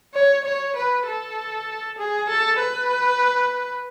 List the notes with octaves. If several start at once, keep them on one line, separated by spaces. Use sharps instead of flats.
C#5
C#5
B4
A4
G#4
A4
B4